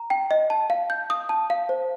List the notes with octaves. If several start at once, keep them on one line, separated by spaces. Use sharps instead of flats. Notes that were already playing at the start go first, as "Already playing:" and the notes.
Already playing: A#5
G5
D#5
A5
F5
G6
D#6
A5
F5
C5